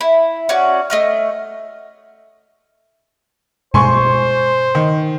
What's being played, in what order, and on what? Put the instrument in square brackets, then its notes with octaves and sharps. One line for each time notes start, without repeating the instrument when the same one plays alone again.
[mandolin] E4
C#4 F#4 D5
A3 D#5 F6
[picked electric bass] G2 B2 G#3 [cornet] C5 [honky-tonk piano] G#5 C6 C#6
[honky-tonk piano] D#3